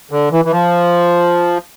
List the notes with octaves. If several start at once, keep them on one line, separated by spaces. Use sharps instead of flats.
D3
E3
E3
F3